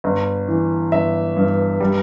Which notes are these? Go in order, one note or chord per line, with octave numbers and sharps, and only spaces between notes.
G1
E3
G1 E5
G2
G3